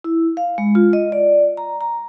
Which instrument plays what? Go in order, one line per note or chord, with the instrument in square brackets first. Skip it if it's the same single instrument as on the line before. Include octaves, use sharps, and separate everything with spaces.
[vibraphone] E4
F5
G#3
F4
D#5
D5
A#5
A#5